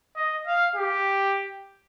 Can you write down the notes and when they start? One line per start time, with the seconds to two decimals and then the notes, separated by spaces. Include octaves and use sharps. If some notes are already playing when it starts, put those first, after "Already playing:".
0.16 D#5
0.47 F5
0.76 G4